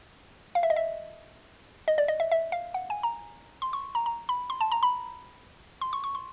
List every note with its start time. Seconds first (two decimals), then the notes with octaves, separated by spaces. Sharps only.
0.55 F5
0.63 E5
0.70 D#5
0.76 E5
1.88 D#5
1.98 D5
2.08 D#5
2.20 E5
2.31 E5
2.52 F5
2.74 F#5
2.90 G#5
3.03 A#5
3.62 C6
3.73 C#6
3.95 A#5
4.06 A#5
4.29 B5
4.50 C6
4.61 A5
4.72 A#5
4.83 B5
5.81 C6
5.93 C#6
6.04 C#6
6.15 C6